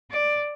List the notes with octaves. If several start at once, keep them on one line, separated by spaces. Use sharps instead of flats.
D5